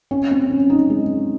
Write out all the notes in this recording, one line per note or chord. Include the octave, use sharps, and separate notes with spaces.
C#4
C4
C#4
D#4
G#3